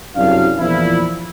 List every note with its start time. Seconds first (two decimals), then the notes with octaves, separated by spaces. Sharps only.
0.16 C2 F#2 C#3 D4 F#4 F5
0.58 E2 A#2 F3 E4